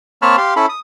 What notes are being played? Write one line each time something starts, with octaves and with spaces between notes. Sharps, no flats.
A#3 C4 C#5 A5 B5 F6
G4 F5 C6
C#4 E4 A4 B5
D#6